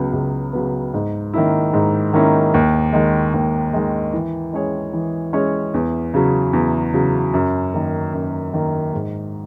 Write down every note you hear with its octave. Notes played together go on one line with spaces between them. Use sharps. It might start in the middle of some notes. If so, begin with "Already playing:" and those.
Already playing: C#2 C#3 F#3 B3
C#2
C#3 F#3 B3
G#2
D#3 A#3 C#4 E4
G#2
D#3 A#3 C#4 E4
D#2
D#3 G#3
D#2
D#3 G#3
E3
G#3 C#4 G#4 C#5
E3
G#3 C#4 G#4 C#5
E2
C#3 F#3
E2
C#3 F#3
F#2
D#3 A#3
F#2
D#3 A#3
G#2